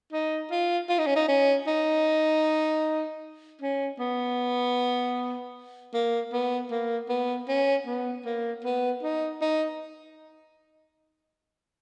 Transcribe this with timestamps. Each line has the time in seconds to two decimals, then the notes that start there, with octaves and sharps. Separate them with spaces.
0.13 D#4
0.51 F4
0.89 F4
0.98 D#4
1.07 C#4
1.16 D#4
1.28 C#4
1.67 D#4
3.61 C#4
3.99 B3
5.94 A#3
6.33 B3
6.71 A#3
7.09 B3
7.48 C#4
7.87 B3
8.25 A#3
8.64 B3
9.03 D#4
9.41 D#4